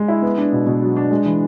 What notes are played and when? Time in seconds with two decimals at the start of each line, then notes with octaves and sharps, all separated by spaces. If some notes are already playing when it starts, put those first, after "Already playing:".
Already playing: G#3
0.08 E4
0.22 B3
0.38 D4
0.52 B2
0.67 B2
0.82 F#3
0.96 D4
1.11 G#3
1.25 E3